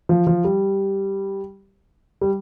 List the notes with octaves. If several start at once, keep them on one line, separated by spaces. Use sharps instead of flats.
F3
F3
G3
G3